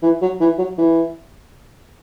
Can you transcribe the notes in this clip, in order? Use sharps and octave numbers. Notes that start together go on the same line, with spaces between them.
E3
F#3
E3
F#3
E3